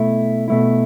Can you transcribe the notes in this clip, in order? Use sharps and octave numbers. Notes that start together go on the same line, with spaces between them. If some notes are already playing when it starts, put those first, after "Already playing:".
Already playing: B2 A3 E4
B2 A3 E4